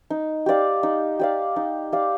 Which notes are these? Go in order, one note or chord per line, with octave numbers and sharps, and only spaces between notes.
D#4
G4 D5 F5
D#4
G4 D5 F5
D#4
G4 D5 F5